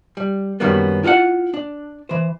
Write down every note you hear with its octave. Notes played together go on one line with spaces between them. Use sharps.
G3
F#2 D#3 F#3 G3 A#3 B3
E4 F4 A4 F5 F#5
D4
E3 C5